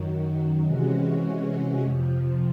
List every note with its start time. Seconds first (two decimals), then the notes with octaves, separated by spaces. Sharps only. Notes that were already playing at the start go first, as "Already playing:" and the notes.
Already playing: F#2 D#3 F#3
0.65 C3 E3 G#3 C#4 F#4
1.81 F2 C3 F3